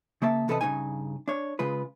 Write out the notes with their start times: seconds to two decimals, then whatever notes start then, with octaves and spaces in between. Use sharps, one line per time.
0.22 C#3 A#3 E5 A5
0.48 E2 C3 A4 B4 D#5 A5
0.61 G2 C#3 E3 A#3 D#4 G#5
1.28 D4 C#5
1.59 C#3 G#3 F4 B4